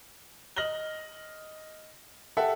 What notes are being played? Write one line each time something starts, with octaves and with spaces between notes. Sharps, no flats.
D#5 F6 A#6 F#7 G7
G4 A4 E5 F#5